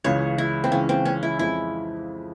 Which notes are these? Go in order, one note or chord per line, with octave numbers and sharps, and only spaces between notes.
C#2 C#3 E3 C#5
E4
C4
C#2 C#3 E3 C#4
C4
C#4
E4
F2 E3 G#3 E4